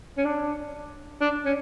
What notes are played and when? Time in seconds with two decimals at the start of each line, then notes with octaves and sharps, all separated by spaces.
0.18 C#4
0.25 D4
1.21 D4
1.46 C#4